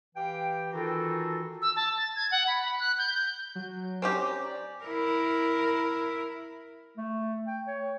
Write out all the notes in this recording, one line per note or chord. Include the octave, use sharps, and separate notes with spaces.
E3 G4 F5 G5
D#3 E3 D#4 F4 F#4 A4
E6
A5
A6
G#6
F#5
B5
B5
F#6
G6
G6
F#3
C4 C#4 G4 A#5
D5
E4 A#4
A3
G5
C#5